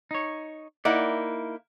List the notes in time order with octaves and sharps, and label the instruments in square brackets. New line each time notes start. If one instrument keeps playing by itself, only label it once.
[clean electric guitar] D#4 C#5
[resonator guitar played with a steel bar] A#3 D#4 E4 [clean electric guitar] D5 F#5